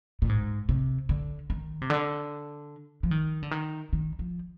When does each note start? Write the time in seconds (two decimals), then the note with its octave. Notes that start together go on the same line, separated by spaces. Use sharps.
0.22 A#2
0.29 G#2
0.69 C3
1.09 D3
1.50 D#3
1.82 C3
1.90 D3
3.03 F3
3.11 D#3
3.43 D3
3.51 D#3
3.93 D#3
4.19 F3